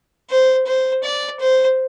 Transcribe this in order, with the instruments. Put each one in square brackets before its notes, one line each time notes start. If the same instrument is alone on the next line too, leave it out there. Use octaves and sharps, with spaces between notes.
[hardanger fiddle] C5
C5
D5
C5